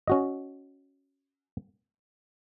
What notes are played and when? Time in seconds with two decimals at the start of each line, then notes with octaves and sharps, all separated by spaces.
0.08 C#4 F#4 D#5